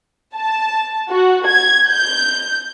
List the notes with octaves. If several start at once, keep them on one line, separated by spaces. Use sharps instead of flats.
A5
F#4
G#6
G6